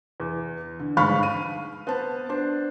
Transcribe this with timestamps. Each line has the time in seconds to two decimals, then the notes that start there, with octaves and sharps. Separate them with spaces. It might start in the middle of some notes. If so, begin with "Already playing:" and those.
0.20 E2
0.79 D3
0.97 G1 G#2 F5 B5 C#6 F6
1.23 D#7
1.87 B3 C5 A5
2.29 D4 C5